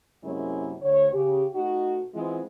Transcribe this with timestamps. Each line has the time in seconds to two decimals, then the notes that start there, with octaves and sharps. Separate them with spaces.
0.23 F#2 C3 G#3 A#3 C#4 E4
0.81 D2 C#5
1.12 C#3 G4
1.54 B2 A3 D#4 F#4
2.13 E3 G#3 B3 C4 E4 F4